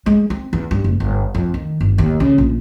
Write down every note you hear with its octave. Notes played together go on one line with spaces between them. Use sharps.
G#3
C4
E2
G2
F#1
G1
F2
D#3
G1
D#2
C#3
A#1